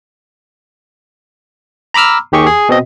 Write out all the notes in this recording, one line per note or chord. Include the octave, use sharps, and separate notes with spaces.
A#5 B5 D6 E6 F6
D#2 D#3 G4 G#4 C#6
G#4
B2 C4 D#5